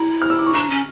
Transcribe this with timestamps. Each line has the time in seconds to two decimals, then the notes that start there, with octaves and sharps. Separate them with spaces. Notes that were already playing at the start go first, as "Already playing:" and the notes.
Already playing: E4 A#5
0.22 F6
0.30 E6
0.39 D6
0.46 C#6
0.54 D4 A#5
0.70 C#4